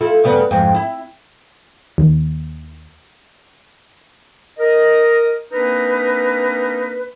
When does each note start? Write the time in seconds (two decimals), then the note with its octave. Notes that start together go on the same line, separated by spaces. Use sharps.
0.01 E4 F4 A4
0.24 G2 C#3 B3
0.51 F2 G#2
0.75 E4
1.98 D#2
4.58 A#4 D#5
5.51 A#3 C4 D4 D#4 A#4 B4